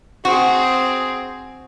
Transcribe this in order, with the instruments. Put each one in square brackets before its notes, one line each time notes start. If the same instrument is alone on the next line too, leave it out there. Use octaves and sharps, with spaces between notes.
[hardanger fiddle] C4 G#4 [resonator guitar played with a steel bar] F#4